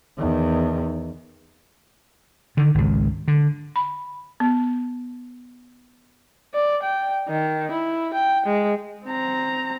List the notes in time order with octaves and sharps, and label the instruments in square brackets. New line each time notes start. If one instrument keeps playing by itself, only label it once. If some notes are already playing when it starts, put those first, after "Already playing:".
[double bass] E2 D#3
[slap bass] D3 D#3
G#1 C#2
D3
[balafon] B5
B3
[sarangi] D5
G5
D#3
E4
G5
G#3
[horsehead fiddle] C4 A#5